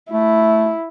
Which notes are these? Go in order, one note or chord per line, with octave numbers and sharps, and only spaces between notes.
A3 E4